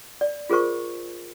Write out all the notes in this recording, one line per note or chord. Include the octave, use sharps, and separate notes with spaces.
D5
F4 G#4 A#4 C5 C#6